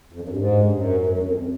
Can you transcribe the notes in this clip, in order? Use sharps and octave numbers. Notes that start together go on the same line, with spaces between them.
F2
F#2
G2
G#2
G2
F#2
F#2
E2
F2